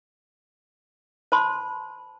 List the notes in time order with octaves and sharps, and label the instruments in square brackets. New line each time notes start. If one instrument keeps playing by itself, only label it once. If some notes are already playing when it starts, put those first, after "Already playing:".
[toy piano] C5 A5 B5 C6